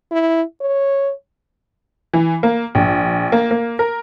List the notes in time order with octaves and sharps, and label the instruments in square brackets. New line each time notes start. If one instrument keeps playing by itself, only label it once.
[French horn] E4
C#5
[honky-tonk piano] E3
A#3
A#1
A#3
A#3
A#4